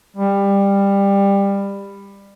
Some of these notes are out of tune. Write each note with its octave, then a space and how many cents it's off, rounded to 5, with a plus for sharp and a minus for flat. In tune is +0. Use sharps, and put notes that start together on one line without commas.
G3 +20